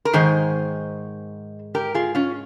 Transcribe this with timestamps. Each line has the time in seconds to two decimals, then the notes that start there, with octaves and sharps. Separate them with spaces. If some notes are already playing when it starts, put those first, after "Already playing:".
0.05 A#4
0.13 G#2 D#3 G#4 C5
1.75 G4 A#4
1.94 F4 G#4
2.15 C#4 F4